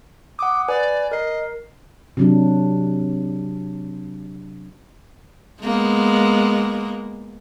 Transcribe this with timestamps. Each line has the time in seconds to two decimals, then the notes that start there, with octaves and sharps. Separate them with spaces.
0.39 F#5 D6 D#6
0.68 B4 D5 G#5
1.12 A#4 D#5 C7
2.17 C3 F#3 D4
5.62 G#3 A#3 B3